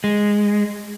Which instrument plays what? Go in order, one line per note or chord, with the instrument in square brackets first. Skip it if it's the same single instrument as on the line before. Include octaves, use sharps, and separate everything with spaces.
[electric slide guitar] G#3